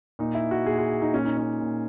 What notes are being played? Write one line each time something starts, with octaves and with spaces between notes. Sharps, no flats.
A#2 D#4
E4
F#4
A#2 G#4
F#4
D#4
A#2 C#4
D#4
C#4
A#2